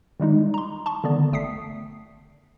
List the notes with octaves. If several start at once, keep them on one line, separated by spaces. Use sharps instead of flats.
D#3 G3 G#3 D#4
A#5 C6
A5 C6 C#6
D3 D#3 B3 D5
G1 A3 G5 D#6 B6 C7